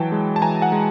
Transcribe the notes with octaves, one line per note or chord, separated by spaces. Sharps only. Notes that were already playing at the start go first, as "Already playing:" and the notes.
Already playing: E3 F#3 G5 A5
G#3
A5
E3 G#5 A#5
F#5 G#5
G#3